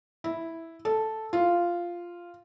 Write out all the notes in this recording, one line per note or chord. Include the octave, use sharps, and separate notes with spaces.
E4
A4
F4